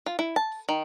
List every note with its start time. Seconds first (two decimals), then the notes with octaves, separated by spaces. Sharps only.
0.06 F4
0.19 E4
0.36 A5
0.69 D#3